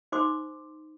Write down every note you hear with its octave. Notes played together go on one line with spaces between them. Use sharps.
D#4 C5 C6 D6